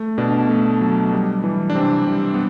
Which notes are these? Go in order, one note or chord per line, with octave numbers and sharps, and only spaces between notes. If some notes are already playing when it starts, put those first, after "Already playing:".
Already playing: A3
B2 D4
A3
F#3
G3
E3
D4
C3 C4
G3
B3